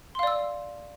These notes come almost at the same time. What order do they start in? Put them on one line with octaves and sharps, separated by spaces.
C6 F5 D5 E6